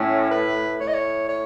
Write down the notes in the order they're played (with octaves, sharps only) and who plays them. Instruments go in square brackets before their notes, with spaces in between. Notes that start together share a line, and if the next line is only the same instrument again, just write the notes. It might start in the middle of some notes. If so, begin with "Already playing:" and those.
Already playing: [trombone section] A2 [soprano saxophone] C#4
[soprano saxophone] B4
[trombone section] A2 [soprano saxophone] C#5
[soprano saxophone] D#5
C#5
C#5